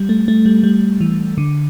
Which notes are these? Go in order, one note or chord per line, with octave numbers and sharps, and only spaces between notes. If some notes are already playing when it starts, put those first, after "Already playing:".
Already playing: G3
A3
A3
G3
G3
E3
D3